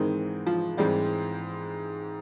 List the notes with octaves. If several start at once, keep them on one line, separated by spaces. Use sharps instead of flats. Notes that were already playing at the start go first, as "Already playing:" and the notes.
Already playing: G#2 D#3 E3 G#3 C4
F3
G#2 E3 G3 G#3 C4